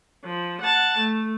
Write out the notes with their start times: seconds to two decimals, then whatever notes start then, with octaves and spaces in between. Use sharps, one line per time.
0.25 F3
0.61 F#5 A5
0.98 A3